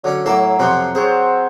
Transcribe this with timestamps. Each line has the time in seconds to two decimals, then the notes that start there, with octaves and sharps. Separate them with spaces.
0.04 D3 F#3 C#4
0.26 A2 F#3 A#3 A4 A5 D6
0.59 F2 C3 F3 C4 F#5 C6 C#6
0.95 C4 G#4 C5 C#5